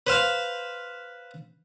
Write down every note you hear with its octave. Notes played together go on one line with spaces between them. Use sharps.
B4 C5 F5